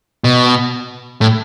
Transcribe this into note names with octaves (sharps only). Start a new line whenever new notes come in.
B2
A2